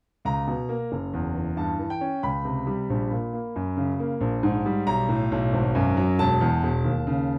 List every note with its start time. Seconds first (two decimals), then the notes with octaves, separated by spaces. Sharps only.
0.25 C#2 A#5
0.47 B2
0.69 A#3
0.92 F#1
1.13 E2
1.35 E3
1.57 G2 A5
1.79 E3
1.90 G5
2.01 C#4
2.23 C#2 B5
2.45 C3
2.67 G3
2.90 A#1
3.11 A#2
3.33 A#3
3.56 F#2
3.77 C#3
3.99 A#3
4.21 A#1
4.43 G#2
4.66 G3
4.87 B1 A#5
5.09 A2
5.32 B1
5.53 G#1
5.75 F#2
5.97 F#3
6.19 E1 A5
6.41 E2
6.63 E1
6.84 D#2
7.07 C#3